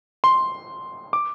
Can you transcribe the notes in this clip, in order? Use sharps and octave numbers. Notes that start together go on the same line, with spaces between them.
C6
D6